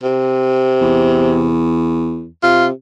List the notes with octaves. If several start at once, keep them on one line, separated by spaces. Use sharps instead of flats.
C3
E2
C3 F4